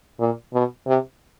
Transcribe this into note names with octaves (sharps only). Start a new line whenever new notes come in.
A#2
B2
C3